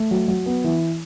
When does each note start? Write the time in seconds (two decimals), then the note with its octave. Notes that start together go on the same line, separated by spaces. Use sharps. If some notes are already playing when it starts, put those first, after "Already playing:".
Already playing: A3
0.11 F#3
0.28 F#3
0.46 B3
0.64 E3